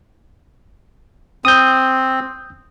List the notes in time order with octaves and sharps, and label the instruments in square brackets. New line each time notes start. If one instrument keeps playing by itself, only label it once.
[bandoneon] C4 [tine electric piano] D#6 G6